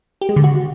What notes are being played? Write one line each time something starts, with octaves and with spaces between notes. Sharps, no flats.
G4
G#3
D3
F#4